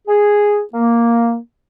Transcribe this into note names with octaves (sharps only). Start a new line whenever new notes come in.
G#4
A#3